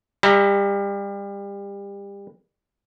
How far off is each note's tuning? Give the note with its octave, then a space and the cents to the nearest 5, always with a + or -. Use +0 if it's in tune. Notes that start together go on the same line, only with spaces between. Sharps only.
G3 +30 E5 +0 A#5 +0